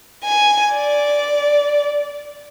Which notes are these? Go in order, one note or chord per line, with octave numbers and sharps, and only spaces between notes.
G#5
D5